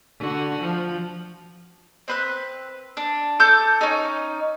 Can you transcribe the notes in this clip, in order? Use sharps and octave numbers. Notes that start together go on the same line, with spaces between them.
D3 F#4
F3
C4 B4 F#6
D4
A4 D6 G6
C#4 D#4